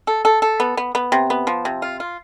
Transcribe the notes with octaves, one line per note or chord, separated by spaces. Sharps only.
A4
A4
A4
B3
B3
B3
C3
B3
F3
C3
F4
F4